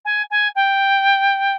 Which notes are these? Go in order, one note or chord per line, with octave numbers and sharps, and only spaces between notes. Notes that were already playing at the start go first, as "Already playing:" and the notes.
G#5
G#5
G5